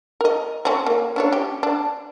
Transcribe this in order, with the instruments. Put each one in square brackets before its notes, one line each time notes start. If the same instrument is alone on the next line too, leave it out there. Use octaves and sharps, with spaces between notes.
[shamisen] A#4 D#5
C4 C#4
A#3
C#4 D4 C#5
G4
D4